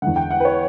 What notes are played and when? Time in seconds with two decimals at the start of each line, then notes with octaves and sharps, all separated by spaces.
0.02 E2 D3 F#5
0.16 G5
0.30 F#5
0.40 B4
0.45 C#5